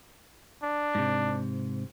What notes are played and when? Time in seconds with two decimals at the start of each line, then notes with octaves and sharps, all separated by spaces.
0.63 D4
0.95 G#2 C3